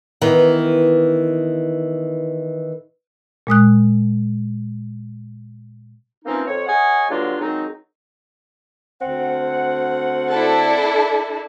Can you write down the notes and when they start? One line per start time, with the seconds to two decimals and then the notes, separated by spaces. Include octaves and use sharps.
0.21 D#3 E3 B3
3.47 A#2 G#3 D#6 F#6
6.25 E3 F3 A#3 C4 C#4 D#4
6.47 F2 C#5
6.66 G#4 C#5 D#5 F#5 G#5
7.09 G2 D3 F#3 A#3 D4 F4
7.40 D#3 F#3 G#3 C4 D#4
9.02 D2 C4 F#5
10.32 D4 E4 A4